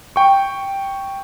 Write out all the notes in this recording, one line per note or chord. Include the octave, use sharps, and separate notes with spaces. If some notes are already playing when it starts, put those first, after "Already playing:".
G5 C#6